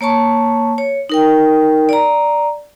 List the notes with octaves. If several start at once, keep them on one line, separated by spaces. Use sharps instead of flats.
A#3 C#5 A5 C#6
C#5
D#4 A#4 G5
D5 A#5